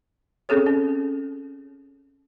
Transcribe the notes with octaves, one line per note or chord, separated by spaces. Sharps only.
C4 C#4 G#4 A4 C#5
C#4